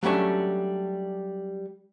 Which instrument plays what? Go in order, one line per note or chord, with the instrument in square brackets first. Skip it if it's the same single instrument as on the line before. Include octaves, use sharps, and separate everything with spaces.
[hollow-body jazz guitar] F#3 G3 A3 C#4 D4